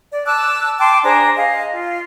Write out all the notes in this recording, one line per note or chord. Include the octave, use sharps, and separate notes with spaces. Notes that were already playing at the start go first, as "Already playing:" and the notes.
D5
A5 D6 E6 F#6
G5 A5 C6 D6
D4 G#4 C5 A#5
G#4 D#5 F5
F4